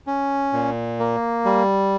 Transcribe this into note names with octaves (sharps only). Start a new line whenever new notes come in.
C#4
A#2
A#3
G3